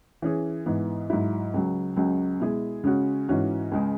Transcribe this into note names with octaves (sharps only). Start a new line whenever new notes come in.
E3 C#4 G#4
G#2 E3 B3
G#2 F#3 E4
C#2 C#3 F#3
C#2 C#3 F#3
B2 G#3 E4 G#4
C#3 G#3 C#4 F#4
G#2 E3 C#4 F#4
C#2 C#3 G#3